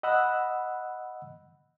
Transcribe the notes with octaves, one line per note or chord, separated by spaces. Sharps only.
D#5 F#5 B5 E6 F#6